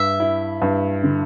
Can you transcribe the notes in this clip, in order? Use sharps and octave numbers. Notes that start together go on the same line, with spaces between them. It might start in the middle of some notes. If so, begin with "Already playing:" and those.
Already playing: G2 E5
E4
G2
D3